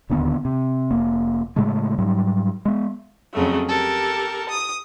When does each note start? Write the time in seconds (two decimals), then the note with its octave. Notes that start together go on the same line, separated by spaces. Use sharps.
0.10 D1 D#2 D3 B3
0.45 C3
0.91 F1 A#3
1.56 A2 C#3 G#3 A3
1.98 G#2 F#3 G3
2.65 G#3 B3
3.33 F2 C#3 F#3 A3
3.68 G4 A4 A#4
4.49 D#6